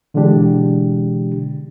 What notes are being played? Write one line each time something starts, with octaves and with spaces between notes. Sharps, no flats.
B2 D3 E3 G#3 D4 G4